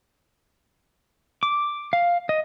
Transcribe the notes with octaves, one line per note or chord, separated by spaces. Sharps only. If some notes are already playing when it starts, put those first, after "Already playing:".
D6
F5
D#5